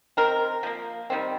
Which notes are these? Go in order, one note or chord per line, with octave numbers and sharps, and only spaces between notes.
D#3 C4 A#4
F3 A#3
D#3 G3 C4